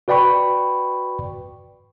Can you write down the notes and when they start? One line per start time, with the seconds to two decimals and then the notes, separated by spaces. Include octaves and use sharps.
0.08 F#4 B4 D5 G5 B5 C#6